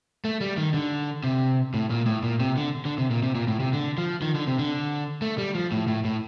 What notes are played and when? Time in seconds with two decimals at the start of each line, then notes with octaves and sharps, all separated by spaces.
0.25 A3
0.41 G3
0.57 D#3
0.74 D3
1.24 C3
1.74 A2
1.90 A#2
2.06 A2
2.23 A#2
2.40 C3
2.57 D3
2.85 D3
2.98 C3
3.11 A#2
3.23 C3
3.35 A#2
3.48 A2
3.60 C3
3.73 D3
3.98 F3
4.22 D#3
4.35 D3
4.47 C3
4.59 D3
5.22 A3
5.38 G3
5.55 F3
5.72 A2
5.88 A2
6.05 A2